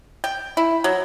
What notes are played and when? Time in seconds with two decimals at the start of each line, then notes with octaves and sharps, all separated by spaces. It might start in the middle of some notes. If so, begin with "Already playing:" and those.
0.24 G5
0.57 E4
0.84 F#3